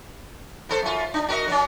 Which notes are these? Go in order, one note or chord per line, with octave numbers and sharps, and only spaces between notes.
B3 A4 C5
F#2 F4
D4
F#4 A#4 D#5
F#3 C#4